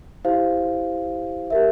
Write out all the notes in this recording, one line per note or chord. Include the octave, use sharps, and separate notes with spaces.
E4 G4 C5 F5
G4 A#4 E5